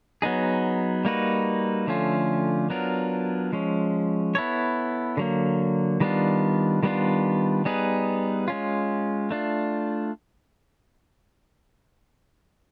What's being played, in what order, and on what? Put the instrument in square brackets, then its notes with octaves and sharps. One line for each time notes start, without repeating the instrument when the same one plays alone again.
[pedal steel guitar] F#3 B3 D#4 G#4
G3 A#3 D#4 F#4 B4
D3 F3 A3 C#4 F4
F#3 B3 D4 F4 A#4
F3 G#3 C#4
B3 E4 A4 C#5
D3 F#3 A#3
D#3 G3 B3 D4 F4
D#3 G3 B3 D4 F4
G3 B3 D#4 G#4 B4
G#3 C#4 F4
A3 D4 F4